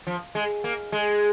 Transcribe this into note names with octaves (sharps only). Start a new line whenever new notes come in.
F3
G#3
A#3
G#3